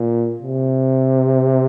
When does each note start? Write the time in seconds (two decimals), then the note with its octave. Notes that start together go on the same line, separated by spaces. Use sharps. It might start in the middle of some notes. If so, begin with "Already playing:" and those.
Already playing: A#2
0.42 C3